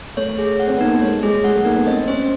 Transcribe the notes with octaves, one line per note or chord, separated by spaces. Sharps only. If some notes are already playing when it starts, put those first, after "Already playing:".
A3 C#5
G#4
F#5
C4
B3
A#3 D#4
A3
G#3 C#5
G#3 G#4
G#3 F#5
A3
A#3 D#4
B3
C4 D#5
C#4 C5